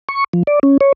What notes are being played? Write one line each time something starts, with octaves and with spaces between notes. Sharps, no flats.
C#6
F3
D5
C#4
C#5